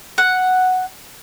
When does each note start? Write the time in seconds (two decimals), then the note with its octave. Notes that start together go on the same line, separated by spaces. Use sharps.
0.18 F#5